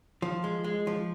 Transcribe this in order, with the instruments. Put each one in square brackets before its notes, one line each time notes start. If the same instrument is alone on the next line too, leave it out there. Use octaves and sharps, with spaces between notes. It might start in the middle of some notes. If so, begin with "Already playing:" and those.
[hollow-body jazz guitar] F3
G#3
G#3
F3